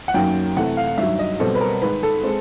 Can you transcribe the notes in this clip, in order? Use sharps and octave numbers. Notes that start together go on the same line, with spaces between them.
F#5
F#2 D#3 F#3 A#3 G5
C3 E3 A3 F#5
F5
G2 D#3 F#3 E5
D#5
B2 G3 C4 A4
B4
A#4
G#2 D#3 G#3 B4
A4
G#3 C4